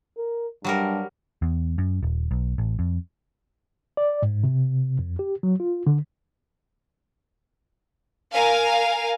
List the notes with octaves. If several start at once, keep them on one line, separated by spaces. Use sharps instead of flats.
A#4
G2 F#3 G3 A#4
E2
F#2
D#1
B1
A1
F2
D5
G#2
C3
F2
G4
F#3
F4
D3
A#4 F5 G#5